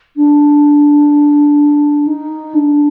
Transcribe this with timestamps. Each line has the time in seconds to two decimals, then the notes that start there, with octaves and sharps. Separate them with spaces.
0.16 D4
2.07 D#4
2.54 D4